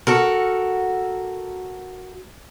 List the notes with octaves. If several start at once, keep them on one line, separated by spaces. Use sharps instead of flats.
F#4 A4 A#4